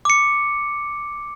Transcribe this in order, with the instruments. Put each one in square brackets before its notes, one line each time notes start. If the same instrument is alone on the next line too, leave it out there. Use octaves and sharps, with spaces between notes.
[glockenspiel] D6 C#7